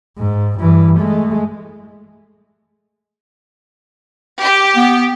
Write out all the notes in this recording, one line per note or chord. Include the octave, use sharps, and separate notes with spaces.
G#2
G2 E3
G#3 A3
G4
B3